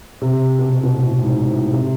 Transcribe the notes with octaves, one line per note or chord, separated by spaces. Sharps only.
C3
B2
C3
B2
A2
G#2
A2
C3